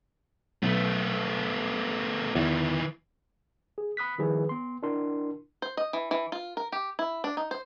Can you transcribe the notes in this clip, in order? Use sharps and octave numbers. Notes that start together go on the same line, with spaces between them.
B1 A3 B3
E2 D#3 E3
G#4
B5 D#6 F#6 B6
D#3 F3 G3 E4 G#4 B4
B3 C6
D4 E4 A#4 C6
C5
D#5
E3
E3
F4
A#4
G4
E4
D4
D#4
C5